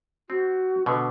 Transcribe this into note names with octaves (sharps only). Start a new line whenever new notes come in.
C4 F#4
B2 D3 B4